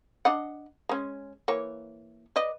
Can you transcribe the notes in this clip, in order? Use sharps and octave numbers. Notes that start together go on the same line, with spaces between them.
D4 D#5 F#5
G#3 C#4
E3 A#3 C#5
B4 D5 D#5